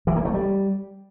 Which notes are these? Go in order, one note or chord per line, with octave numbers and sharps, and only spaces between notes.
E3
A#3
A3
G3